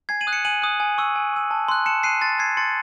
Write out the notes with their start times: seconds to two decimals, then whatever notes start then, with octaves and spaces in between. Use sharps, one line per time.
0.09 G#5 G#6 C7
0.21 D#7 F#7
0.27 D#6 F#6
0.33 C#7 E7
0.45 G#5 D#7 F#7
0.62 D#6 F#6
0.80 G#5
0.98 C#6 E6
1.16 G#5
1.33 C#6 E6
1.51 A5
1.68 C6 F#6
1.86 A5 C#7 E7
2.03 C6 F#6 C7 D#7
2.22 C6 A6
2.39 E6 G#6 C7
2.57 C6 A6 C#7